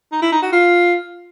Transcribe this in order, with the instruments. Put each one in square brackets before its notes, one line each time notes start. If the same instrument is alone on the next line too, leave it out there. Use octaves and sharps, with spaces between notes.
[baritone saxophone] D#4
E4
D#4
F#4
F4